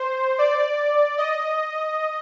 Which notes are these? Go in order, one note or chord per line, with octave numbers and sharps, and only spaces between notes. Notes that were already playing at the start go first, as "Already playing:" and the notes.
Already playing: C5
D5
D#5